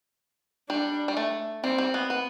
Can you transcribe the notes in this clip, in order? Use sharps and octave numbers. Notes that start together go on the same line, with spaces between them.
G3 D4
G3
A3
G3 C4
G3
B3
B3